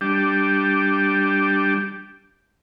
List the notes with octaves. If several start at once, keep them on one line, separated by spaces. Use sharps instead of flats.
G3 D4 G4